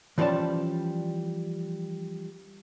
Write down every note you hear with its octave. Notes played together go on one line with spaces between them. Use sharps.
E3 F3 G3 C#4 D5 A5